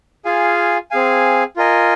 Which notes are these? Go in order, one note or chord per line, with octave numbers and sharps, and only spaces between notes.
F4 G#4 F5 G#5
C4 G#4 F5 G#5
F4 A#4 D#5 G#5